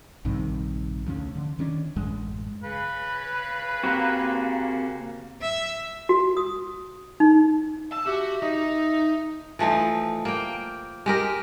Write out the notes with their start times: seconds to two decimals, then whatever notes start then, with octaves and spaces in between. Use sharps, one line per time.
0.25 A#1 G2 C3 D#3
1.07 D2 F3 B3 C#4
1.36 D3
1.59 D#3 C#4 D4
1.96 A1 F#2 G#3
2.63 C#3 B4
3.84 A#3 C4 F#4 G4
5.41 E5
6.09 F#4
6.37 D#6
7.20 D#4
7.92 A5 E6
8.06 F#4 G4 E5
8.42 D#4 D#5
9.59 E3 F3 A3 D#4
10.25 A#3 G5
11.06 G#3 G4 A#4